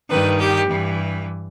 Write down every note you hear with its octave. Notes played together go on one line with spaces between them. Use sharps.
G2 D#3 B4
G4
G2 E3